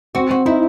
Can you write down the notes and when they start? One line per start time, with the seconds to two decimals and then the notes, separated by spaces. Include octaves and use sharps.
0.15 C4 F#4
0.30 C4 F#4
0.46 D#4 E4